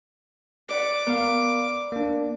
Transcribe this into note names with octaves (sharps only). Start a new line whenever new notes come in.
B4 D5 F#5 D6
B3 A#4 F5
A#3 D4